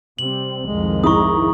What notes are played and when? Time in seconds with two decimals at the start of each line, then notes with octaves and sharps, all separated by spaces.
0.19 C3 G3 C4 F#7
0.67 C2 F2 D#3 G#3
1.04 G#2 E4 A#5 C#6 D#6